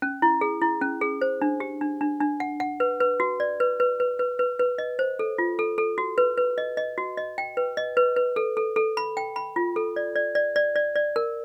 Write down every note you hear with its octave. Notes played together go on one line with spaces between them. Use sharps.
C#4
E4
G#4
E4
C#4
G#4
C5
D4
G4
D4
D4
D4
F#5
F#5
B4
B4
F#4
D5
B4
B4
B4
B4
B4
B4
D#5
C5
A4
F4
A4
A4
F#4
B4
B4
D#5
D#5
F#4
D#5
G5
B4
D#5
B4
B4
A4
A4
A4
B5
G5
B5
F4
A4
D5
D5
D5
D5
D5
D5
A#4